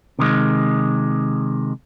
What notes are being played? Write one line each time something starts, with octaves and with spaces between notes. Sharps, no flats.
C3 D#3 G#3